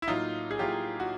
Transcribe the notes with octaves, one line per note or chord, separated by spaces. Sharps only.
E4
A2 F#3 A#3 D#4 F4
G#4
A2 F#3 A#3 F4 G4
F#4